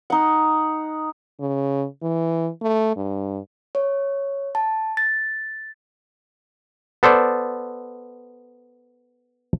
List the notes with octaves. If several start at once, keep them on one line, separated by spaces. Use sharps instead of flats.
D#4 F#5
C#3
E3
A3
G2
C#5
A5
A6
B3 A4 C5 D5